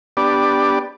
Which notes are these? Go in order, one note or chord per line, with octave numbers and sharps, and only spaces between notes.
B3 D4 G4 D5